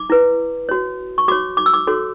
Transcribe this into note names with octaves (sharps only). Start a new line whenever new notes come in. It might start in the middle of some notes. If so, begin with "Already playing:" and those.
Already playing: D6
E4 B4
F#4 C#5
C#6
F#4 C#5 D6
D6
E6
D6
F#4 A4 C#5